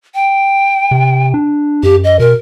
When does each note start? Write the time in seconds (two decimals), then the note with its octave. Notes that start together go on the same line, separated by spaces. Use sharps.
0.15 G5
0.91 C3
1.34 D4
1.83 F#2 G4
2.04 D#5
2.19 B2 A#4